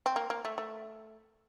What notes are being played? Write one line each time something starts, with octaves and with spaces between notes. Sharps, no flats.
C4
A#3
A#3
A3
A3